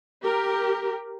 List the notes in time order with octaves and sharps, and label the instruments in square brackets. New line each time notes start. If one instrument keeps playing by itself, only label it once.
[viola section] G4 A#4